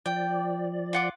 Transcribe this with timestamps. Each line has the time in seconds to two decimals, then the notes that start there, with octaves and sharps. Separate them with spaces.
0.06 F3 D5 G5
0.93 F4 F#5 D6